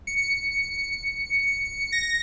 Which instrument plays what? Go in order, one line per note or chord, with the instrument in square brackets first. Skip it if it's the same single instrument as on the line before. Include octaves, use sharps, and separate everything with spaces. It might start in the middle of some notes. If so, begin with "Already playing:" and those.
[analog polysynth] C#7
A#6